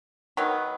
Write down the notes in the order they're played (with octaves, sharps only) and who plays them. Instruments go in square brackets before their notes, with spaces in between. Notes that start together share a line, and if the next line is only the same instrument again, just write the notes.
[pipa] D#3 F#3 B3